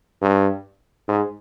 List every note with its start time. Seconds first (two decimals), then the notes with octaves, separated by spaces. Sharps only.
0.22 G2
1.09 G#2